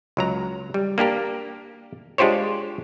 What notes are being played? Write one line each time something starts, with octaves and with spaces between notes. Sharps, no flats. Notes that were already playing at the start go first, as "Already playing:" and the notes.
C#2 F#3 A#5
G3
A#3 D4 G4 A#4
G#3 D4 F4 G4 C5 C#5